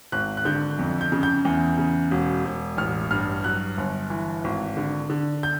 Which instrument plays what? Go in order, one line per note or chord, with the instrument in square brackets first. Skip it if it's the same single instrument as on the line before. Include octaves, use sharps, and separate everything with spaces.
[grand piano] G#1 F#6
F#6
D3 G6
F2
G6
C#3
G6
E2
C#3
E1
E1
A1 F6
G2 F6
F#3 F#6
G1
E3
G#1
D3
D3
G6